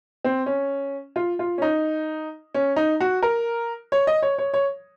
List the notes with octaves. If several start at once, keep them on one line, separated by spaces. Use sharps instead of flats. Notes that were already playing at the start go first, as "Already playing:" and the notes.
C4
C#4
F4
F4
C#4
D#4
C#4
D#4
F#4
A#4
C#5
D#5
C#5
C#5
C#5